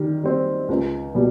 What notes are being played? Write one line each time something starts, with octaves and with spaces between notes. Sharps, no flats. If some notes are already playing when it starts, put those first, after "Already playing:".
Already playing: D#3 G3
G3 C4
C#2
B2 G3